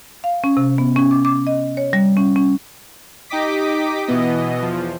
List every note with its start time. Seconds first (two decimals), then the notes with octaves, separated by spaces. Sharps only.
0.24 F5
0.44 C#4
0.57 C3
0.78 B3
0.96 C#4
1.11 D6
1.25 D6
1.47 D#5
1.77 C#5
1.93 G3
2.17 C#4
2.36 C#4
3.30 D#4 G4 D#5 D6 B6
4.07 B2 E3 B3 D#5
4.62 E2 F3